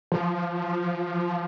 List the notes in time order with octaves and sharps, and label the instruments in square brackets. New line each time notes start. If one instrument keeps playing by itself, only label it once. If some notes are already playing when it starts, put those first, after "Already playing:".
[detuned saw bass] F3